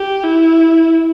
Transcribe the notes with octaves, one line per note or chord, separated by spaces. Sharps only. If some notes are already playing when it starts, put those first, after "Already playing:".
Already playing: G4
E4